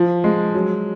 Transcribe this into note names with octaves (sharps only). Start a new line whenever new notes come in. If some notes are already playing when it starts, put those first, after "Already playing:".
Already playing: F3
G#3
F#3